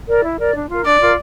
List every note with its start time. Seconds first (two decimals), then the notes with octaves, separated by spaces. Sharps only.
0.09 A#4 D5
0.24 E4
0.39 A#4 D5
0.55 D4
0.70 F4 A#4
0.85 D4 D5
1.00 F4 A#4